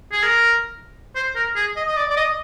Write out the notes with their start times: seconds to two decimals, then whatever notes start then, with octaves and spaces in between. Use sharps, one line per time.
0.12 G#4
0.23 A#4
1.15 C5
1.36 A#4
1.56 G#4
1.76 D#5
1.87 D#5
1.96 D5
2.10 D5
2.17 D#5